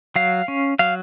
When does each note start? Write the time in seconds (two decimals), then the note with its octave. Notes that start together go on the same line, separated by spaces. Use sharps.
0.16 F#3 F5
0.48 C#4
0.79 F#3 F5